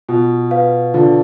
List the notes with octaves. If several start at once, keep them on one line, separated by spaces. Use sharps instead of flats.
B2 F4
B4 F5
D3 F4